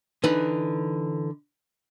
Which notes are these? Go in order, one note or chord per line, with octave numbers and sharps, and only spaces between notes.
D3 E3 D#4 B4